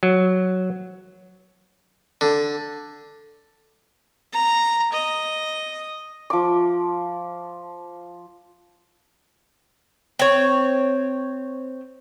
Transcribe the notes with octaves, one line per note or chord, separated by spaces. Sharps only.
F#3
D3
A#5
D#5
F3 D6
C4 C#5